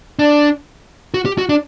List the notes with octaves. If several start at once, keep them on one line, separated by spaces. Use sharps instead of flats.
D4
F#4
G4
F#4
D4